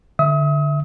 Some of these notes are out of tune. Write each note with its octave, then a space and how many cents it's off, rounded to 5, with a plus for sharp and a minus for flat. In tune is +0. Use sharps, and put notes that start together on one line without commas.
D3 +0 E5 +0 D#6 +40